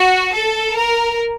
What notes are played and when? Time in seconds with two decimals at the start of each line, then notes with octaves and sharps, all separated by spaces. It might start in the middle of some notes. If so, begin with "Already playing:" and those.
Already playing: F#4
0.33 A4
0.75 A#4